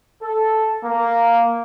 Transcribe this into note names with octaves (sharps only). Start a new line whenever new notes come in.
A4
A#3